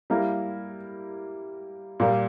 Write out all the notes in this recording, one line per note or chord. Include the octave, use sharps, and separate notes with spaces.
G3 A#3 E4 A#4
A#2 G3 A#3